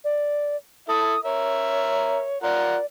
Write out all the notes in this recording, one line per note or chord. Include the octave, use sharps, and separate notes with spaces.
D5
E4 A4 E5 D#6
A#4 C#5 E5
F4 A#4 D5 F#5